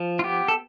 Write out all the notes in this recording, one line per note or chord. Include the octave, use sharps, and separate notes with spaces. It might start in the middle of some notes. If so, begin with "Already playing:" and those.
Already playing: F3
F4
B3 G4
A4